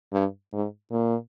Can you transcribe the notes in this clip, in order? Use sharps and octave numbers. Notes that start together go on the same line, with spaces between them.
G2
G#2
A#2